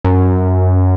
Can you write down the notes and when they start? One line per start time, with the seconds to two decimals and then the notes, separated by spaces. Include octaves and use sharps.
0.04 F#2